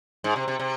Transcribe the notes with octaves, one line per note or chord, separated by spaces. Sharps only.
G#2
C3
C3
C3